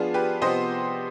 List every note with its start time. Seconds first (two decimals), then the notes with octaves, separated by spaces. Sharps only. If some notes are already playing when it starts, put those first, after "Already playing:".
Already playing: F3 B3 D4 F4 G#4
0.14 G4 B4
0.41 C3 F3 B3 C5 D#5